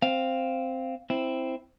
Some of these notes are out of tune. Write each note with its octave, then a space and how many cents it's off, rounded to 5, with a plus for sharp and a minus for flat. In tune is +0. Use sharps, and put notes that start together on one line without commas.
C4 +0 F5 +0
C4 +0 E4 +0